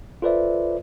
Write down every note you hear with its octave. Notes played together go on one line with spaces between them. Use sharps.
F4 A4 B4 C5 D5 E5